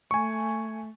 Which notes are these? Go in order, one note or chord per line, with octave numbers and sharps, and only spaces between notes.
A3 G#5 C#6